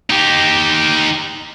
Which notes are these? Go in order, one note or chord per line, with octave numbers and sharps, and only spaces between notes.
D#4 G4